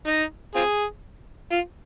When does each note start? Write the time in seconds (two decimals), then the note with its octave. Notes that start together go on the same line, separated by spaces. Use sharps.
0.07 D#4
0.55 C4 F4 G#4
1.51 F4